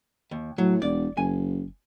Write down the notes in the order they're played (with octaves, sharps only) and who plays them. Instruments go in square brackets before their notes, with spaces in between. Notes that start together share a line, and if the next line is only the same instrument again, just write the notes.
[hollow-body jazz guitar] D#2
[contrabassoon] A2 [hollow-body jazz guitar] F#3
[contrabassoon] E1 [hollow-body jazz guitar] D5
[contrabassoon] F#1 [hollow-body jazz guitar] G#5